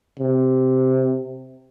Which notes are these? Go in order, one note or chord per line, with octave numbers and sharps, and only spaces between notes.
C3